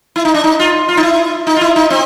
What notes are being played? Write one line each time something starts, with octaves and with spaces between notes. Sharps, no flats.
E4
D#4
D4
D#4
F4
F4
D#4
E4
D#4
F4
E4
D#4
C4